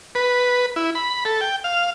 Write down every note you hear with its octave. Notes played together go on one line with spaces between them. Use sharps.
B4
E4
B5
A4
G5
F5